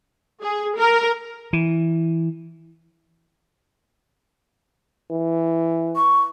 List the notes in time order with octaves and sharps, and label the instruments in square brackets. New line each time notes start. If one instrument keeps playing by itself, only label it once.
[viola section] G#4
A#4
[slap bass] E3
[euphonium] E3
[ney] C#6